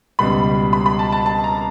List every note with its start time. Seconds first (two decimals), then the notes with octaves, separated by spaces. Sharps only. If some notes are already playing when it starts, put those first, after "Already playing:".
0.19 C#2 B2 G3 B5
0.73 B5
0.86 B5
0.99 A5
1.12 A5
1.26 A5
1.44 A#5